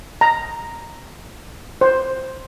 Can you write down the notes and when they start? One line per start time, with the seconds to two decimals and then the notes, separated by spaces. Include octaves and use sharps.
0.21 A#5
1.81 C5